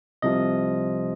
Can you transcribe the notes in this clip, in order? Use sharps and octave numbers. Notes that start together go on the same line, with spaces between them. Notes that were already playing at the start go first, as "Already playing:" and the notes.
C2 C3 F3 D#5